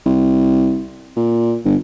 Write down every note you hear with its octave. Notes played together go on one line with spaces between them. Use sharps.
C2
A#2
G1